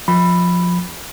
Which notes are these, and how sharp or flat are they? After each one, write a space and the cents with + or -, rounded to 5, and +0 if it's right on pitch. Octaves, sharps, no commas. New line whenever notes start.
F3 +20 B5 +0